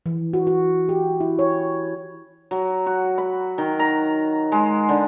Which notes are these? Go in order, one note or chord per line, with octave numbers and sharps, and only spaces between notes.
E3
F#4
F#4
G4
E4
C#5
F#3
F#4
B5
D#3
A#5
G#3
D3